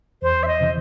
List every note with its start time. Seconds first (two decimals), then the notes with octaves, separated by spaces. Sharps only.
0.22 E2 C5
0.43 E5
0.48 D#5
0.60 C3 E3